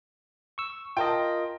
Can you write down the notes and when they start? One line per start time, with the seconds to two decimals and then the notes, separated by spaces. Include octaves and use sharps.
0.58 C#6 E6
0.97 F4 A#4 D#5 G5 A5